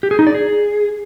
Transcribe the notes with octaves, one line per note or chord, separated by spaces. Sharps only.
G4
G#4
D#4
D5
G#4